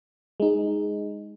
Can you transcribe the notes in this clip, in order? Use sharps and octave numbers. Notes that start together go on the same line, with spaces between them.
G#3 D#4